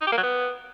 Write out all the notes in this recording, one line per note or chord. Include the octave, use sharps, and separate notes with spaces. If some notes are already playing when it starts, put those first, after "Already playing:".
D#4
G4
A#3
F#3
B3